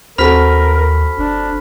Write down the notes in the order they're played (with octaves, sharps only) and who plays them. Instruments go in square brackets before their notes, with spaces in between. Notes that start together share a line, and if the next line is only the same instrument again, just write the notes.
[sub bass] D#2 [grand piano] C4 F#4 A4 [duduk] A#4 [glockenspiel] B5 F6 B6
[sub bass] G1 [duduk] D4